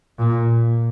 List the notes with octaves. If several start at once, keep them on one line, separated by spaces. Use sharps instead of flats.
A#2